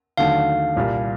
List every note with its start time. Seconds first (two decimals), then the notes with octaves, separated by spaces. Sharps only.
0.17 D#2 D3 F#3 A3 F5
0.76 C2 A#2 G3